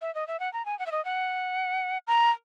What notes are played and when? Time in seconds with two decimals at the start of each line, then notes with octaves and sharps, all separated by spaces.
0.02 E5
0.15 D#5
0.28 E5
0.40 F#5
0.53 A#5
0.66 G#5
0.79 F#5
0.86 E5
0.92 D#5
1.05 F#5
2.07 A#5